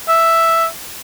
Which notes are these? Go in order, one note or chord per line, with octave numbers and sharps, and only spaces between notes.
E5